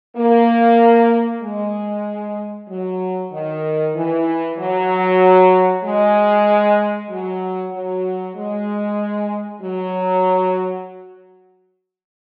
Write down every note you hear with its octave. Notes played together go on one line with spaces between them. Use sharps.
A#3
G#3
F#3
D#3
E3
F#3
G#3
F#3
F#3
G#3
F#3